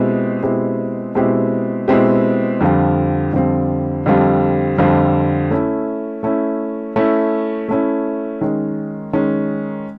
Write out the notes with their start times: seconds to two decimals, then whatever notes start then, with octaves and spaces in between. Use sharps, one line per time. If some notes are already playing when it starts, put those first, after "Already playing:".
Already playing: B2 G#3 C4 E4 G4
0.43 B2 G#3 C4 E4 G4
1.15 B2 G#3 C4 E4 G4
1.88 B2 G#3 C4 E4 G4
2.61 F2 D3 G3 C4 F4
3.33 F2 D3 G3 C4 F4
4.06 F2 D3 G3 C4 F4
4.78 F2 D3 G3 C4 F4
5.51 A3 C#4 E4
6.23 A3 C#4 E4
6.96 A3 C#4 E4
7.69 A3 C#4 E4
8.41 D#3 G#3 C#4
9.13 D#3 G#3 C#4